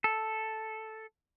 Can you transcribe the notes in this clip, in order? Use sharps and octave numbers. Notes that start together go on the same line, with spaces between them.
A4